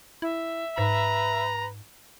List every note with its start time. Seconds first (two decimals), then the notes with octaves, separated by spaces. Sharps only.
0.22 E4 E5
0.78 G#2 B4 A#5